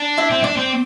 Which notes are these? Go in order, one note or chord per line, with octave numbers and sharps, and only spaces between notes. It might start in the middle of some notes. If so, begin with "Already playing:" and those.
Already playing: D4
E4 E5
C4
D4 D5
C4